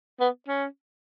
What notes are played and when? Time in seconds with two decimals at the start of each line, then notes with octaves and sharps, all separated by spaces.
0.20 B3
0.48 C#4